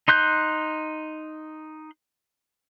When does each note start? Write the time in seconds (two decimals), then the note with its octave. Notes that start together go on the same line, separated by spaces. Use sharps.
0.08 D#4 C6 F#6 G6